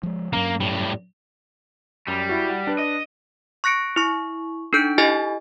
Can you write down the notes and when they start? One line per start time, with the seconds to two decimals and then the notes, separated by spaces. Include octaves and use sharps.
0.03 F3 G#3
0.33 G2 F#3 A#3 C#4
0.61 A2 G3
2.08 F#2 G3
2.29 E4 F#4
2.50 F#5
2.67 D4 B4
2.79 D#5
3.64 C#6 F#6 A#6 C#7 D7
3.96 E4 C#6
4.73 D4 D#4 A4 G6 D7
4.98 E4 G4 A4 D#5 G#5 A6